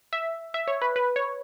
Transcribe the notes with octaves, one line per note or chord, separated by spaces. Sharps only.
E5
E5
C#5
B4
B4
C#5